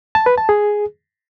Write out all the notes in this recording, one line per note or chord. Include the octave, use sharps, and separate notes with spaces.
A5
B4
A5
G#4